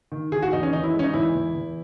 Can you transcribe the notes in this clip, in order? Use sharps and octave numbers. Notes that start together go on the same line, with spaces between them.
D#3
D#3 G#4
F#4
E2 D#4
C#4
D#3 D#4
E4
G#3
C#4
D#4
E2 E4
E2
E2